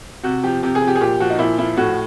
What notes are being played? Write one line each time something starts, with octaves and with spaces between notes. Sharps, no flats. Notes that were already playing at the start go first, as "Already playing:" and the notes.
C3 F#4
F3 G4
C3 G4
G#4
F3
G4
G#4
A#2 G4
F3 F#4
D#4
A#2 E4
F3 E4
A2 F#4